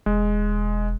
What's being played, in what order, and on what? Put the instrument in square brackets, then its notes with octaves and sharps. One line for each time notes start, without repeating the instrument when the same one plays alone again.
[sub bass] E1 [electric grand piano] G#3